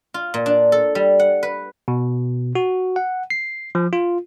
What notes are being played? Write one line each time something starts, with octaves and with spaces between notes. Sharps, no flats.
F4
A#2
D4
A4
G3
F#5
B4
B2
F#4
F#5
C7
F3
F4